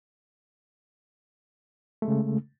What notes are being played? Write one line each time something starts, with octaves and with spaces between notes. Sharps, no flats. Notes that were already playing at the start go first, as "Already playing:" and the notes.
C#3 G#3 A3